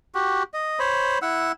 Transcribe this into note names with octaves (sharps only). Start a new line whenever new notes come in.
F#4 G4
D#5
C5 C#5 B5
E4 F#5 E6